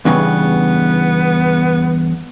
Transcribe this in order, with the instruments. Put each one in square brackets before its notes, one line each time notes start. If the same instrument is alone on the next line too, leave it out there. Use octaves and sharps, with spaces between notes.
[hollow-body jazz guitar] E2 G2 C#3 [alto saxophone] B3